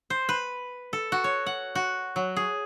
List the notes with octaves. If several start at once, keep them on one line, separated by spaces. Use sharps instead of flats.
C5
B4
A4
F#4
C#5
F#5
F#4
F#3
G#4